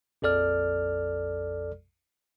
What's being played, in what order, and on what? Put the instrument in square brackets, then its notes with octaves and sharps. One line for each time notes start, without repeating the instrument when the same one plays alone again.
[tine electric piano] A#1 F2 A4 D5 F6